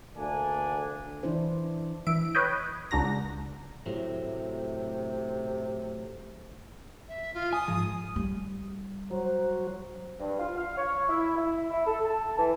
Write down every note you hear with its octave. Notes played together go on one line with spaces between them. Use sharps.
D2 D3 A#3 D4 G#5
E3 D4 E4 C5
E3 E5 D7
B4 C#5 D#5 G5
C#2 D4 F#4 A#5 A#6
A2 C3 F#3 A3
E5
F4
G#5 D#6
G#2 F3 G#3
G3
F#3 C5
G2
F4
F5
C#5
E4
E4
E4
A4
A5
E3